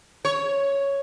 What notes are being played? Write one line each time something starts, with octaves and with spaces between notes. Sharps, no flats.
C#5